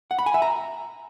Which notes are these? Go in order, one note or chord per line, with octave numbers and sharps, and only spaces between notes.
F#5
B5
G#5
E5
A#5